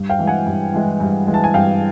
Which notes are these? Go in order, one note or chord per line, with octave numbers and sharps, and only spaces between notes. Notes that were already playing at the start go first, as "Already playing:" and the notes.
Already playing: G2
F5 G5
E3 G#3
F#5 G#5
G2
E3 G#3
G2
E3 G#3
A5
G#5
G2 F5 G5